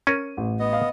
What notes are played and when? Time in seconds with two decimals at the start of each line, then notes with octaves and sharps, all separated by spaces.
0.07 C#4 A#4 D#7
0.37 A1
0.59 B3 D#5
0.73 F5